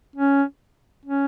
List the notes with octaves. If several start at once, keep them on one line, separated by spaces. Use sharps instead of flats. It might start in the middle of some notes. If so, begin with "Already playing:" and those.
C#4
C#4